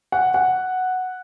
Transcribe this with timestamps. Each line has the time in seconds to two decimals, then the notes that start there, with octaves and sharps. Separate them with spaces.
0.12 F#5
0.34 F#5